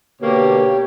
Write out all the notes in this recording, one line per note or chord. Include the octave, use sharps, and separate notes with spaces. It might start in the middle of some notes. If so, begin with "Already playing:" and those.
B2 D3 A#3 G4 C#5